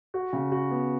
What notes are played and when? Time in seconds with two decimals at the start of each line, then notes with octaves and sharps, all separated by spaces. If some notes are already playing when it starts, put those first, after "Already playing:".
0.14 F#4
0.33 C#3
0.52 F#4
0.71 B3